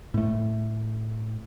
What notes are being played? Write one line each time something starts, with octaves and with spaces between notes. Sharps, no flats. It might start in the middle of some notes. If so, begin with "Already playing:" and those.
A2 A3